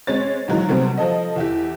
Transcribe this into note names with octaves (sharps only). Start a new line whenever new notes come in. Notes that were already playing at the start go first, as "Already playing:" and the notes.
G#3 C4 C#4 C#5 A6
A#1 D#3 E3 F#3 G#3
C3 F#3 G3 A3 B3 C4
F3 A4 D#5
E2 E4 G4